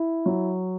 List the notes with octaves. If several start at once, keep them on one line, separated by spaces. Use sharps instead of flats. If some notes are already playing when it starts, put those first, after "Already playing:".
Already playing: E4
F#3